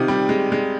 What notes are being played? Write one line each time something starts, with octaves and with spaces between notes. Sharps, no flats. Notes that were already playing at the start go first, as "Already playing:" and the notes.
Already playing: C3 D#3 D#4 F4
G3
G#3
G#3